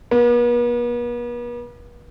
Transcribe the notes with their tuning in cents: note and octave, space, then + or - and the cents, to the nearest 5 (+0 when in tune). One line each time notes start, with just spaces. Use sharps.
B3 -45